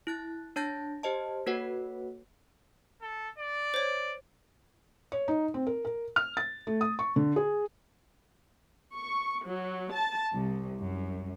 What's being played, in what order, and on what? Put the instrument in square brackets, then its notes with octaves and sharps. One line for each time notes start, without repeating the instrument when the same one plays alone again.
[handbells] E4 F#6 A6
D4 C#5 A5 G6 A6 A#6
G4 C5 D#5 A5
A#3 F#4 A4 B4 C#5 F#5
[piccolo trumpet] A4
D5
[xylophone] C5 C#5
[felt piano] C#5
D#4
C4
A#4
A#4
F6
A6
A3
D#6
C#6
D3
G#4
[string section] C#6
F#3
A5
C2
F#2